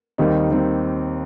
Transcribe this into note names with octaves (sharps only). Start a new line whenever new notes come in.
D#2 D#3 G3 C4 D#4
D#3 G3 C4 D#4